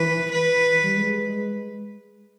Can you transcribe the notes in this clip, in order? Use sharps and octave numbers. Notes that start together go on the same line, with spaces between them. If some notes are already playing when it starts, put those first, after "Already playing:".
Already playing: E3 B4
B4
E3
G3
G#3